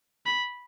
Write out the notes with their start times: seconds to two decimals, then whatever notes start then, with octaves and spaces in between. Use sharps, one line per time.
0.26 B5